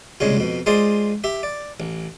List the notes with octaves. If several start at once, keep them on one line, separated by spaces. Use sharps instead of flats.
C2 A#2 C#3 G#3 C#5
F2 B2
G#3 F4 G#4 C5 D5
G4 E5
D5
A1